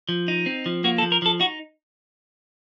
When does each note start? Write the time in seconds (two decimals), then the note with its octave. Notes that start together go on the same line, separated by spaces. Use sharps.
0.09 F3
0.28 D#4
0.46 C4
0.66 F3
0.84 A#3 F#4
0.98 A4
1.02 F3
1.12 A#4
1.22 F3 A4
1.40 D#4 F#4